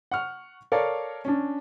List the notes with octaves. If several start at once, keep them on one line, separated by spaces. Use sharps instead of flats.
F#5 C#6 F6
A4 A#4 C#5 D5 F5
C#4 D4